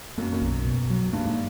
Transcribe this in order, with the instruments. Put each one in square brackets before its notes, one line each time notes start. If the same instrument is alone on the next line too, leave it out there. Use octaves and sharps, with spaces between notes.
[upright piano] F#2 [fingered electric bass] A#3
[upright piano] F#2
[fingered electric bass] B1
B2
F#3
[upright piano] G2 [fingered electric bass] A#3
[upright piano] G#2